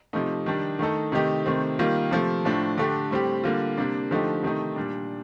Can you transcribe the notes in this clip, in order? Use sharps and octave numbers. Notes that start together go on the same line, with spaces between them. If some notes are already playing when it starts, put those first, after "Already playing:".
C3 F3 A3 D#4
D#3 G3 D4
D#3 A3 D#4 A4
C3 D#3 A3 D#4 G4
C3 D#3 A3 C4
D#3 G3 A#3 F4
C3 F3 A3
A2 F3 A3 D4
D3 A3 D4 G4
A2 G3 C4 G4
D3 G3 A#3 F4
C3 G3 A#3 D4
D3 F3 A3 D#4 G4
C3 D#3 A3 D#4
A#2 G3 D4